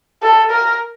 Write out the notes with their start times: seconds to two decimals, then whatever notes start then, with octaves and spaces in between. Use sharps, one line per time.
0.22 A4
0.51 A#4